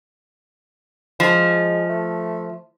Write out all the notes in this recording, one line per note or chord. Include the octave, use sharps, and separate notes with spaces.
F3 G#3
A3